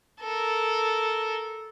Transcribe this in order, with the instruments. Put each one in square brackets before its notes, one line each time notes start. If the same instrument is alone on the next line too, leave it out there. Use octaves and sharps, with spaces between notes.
[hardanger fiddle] A4 A#4